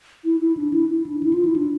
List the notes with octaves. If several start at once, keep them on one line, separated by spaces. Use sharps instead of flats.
E4
E4
D4
E4
E4
D4
E4
F4
E4
D4